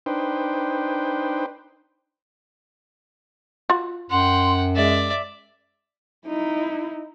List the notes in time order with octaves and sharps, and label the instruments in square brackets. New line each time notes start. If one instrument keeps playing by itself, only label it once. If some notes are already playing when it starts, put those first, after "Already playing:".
[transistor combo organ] D4 D#4 B4 C5 G5
[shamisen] F4 F#4
[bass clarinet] F#2 [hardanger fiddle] F#5 G5 [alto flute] C6
[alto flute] G#3 [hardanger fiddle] D5 E5
[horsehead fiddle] D#4 E4